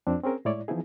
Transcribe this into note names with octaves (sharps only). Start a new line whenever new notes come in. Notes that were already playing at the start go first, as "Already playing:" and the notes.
F2 C4 D4
C4 C#4 G#4 A#4
A2 G#3 E4 C#5 D5
E3 F3 B3 D#4 E4 G#4